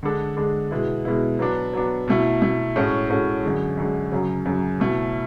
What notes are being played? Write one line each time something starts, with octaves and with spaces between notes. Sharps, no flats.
D3 G#3 D4 A4
D3 G#3 D4 A4
B2 G#3 B3 E4
B2 G#3 B3 E4
F#3 B3 D4
F#3 B3 D4
B2 A3 E4
B2 A3 E4
A2 G#3 C#4 F#4 A4
A2 G#3 C#4 F#4 A4
F#2 D3 G#3
F#2 D3 G#3
F#2 C#3 F#3
F#2 C#3 F#3
B2 A3 E4